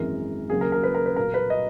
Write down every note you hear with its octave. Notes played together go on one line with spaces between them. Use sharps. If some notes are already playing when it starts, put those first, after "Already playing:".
Already playing: G#1 F#2 E3 G#3 A#4
D#2 C#3 F#3 A#3 G#4
A#4
A#4
B4
A#4
B4
B1 A#2 A#3 A#4
B4
D#5